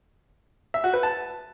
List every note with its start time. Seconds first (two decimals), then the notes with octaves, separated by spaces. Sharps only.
0.74 E5
0.84 F#4
0.93 B4
1.03 A5